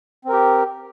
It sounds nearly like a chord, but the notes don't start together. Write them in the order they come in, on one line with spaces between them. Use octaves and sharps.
C4 A#4 G4